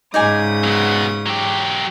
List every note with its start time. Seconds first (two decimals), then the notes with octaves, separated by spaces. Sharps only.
0.14 G#2 C#3 D#4 D5 G#5 D#6
0.63 F#3 B3
1.26 F#3 G4